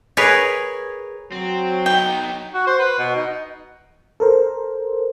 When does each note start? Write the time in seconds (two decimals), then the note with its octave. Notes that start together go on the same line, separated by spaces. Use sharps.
0.17 G#4 A#4 B4 C#5
1.32 F#3 C4
1.86 B3 D#4 G5
2.54 F#4
2.67 C5
2.79 B4
2.98 B2
3.15 D#4
4.20 A4 A#4 C5